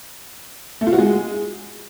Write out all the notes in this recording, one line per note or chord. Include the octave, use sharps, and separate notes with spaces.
A3
F4
F#4
G#3